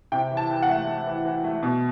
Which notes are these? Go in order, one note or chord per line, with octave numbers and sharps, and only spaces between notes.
C3 G5
E3
A5
E3
F#5
A3
A3
E3
E3
A3
B2